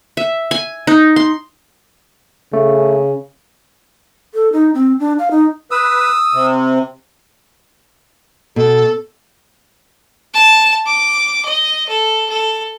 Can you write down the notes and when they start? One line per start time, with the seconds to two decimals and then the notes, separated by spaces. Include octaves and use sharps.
0.17 E5
0.51 G#5
0.87 D#4
1.16 C6
2.53 C#3 A3
4.34 A4
4.53 D#4
4.74 C4
5.00 D4
5.19 F5
5.31 D#4
5.71 B4 D#6 E6
6.34 C3
8.56 B2 A4
10.34 A5
10.86 D6
11.45 D#5
11.89 A4
12.29 A4